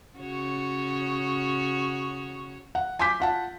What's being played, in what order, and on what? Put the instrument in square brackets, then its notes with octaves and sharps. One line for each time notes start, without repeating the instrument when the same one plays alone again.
[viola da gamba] C#3 F#4 C#5
[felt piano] F#5
G#5 C6 D6 G6 B6
F4 F#5 A5